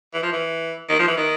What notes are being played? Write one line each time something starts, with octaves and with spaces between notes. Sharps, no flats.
E3
F3
E3
D#3
F3
E3
D#3